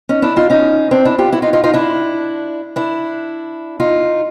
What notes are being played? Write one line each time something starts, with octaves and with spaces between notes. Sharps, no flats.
C#4 D#4
D4 E4
D#4 F4
C#4 D#4
C4 D4
D4 E4
F4 G4
E4 F#4
D#4 F4
D#4 F4
D#4 F4
D4 E4
D4 E4
D#4 F4